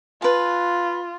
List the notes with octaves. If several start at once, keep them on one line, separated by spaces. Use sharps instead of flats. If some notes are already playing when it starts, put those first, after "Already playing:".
F4 B4 A5